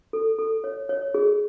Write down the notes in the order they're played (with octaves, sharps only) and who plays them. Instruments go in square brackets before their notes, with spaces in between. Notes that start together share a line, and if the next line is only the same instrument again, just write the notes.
[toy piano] A4
A4
C#5
C#5
G#4